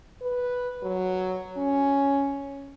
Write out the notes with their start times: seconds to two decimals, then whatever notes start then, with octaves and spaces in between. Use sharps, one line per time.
0.21 B4
0.83 F#3
1.57 C#4